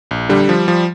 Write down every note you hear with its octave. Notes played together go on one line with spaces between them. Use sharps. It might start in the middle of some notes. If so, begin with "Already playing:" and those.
A#1
D3 G3
F3
F3